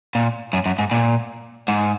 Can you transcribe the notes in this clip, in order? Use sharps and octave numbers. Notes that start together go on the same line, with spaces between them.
A#2
F#2
F#2
G#2
A#2
G#2